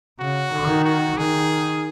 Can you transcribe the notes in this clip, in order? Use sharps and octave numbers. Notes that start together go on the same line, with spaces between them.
C#3 F#4
D#3
F#4
D#3 G#4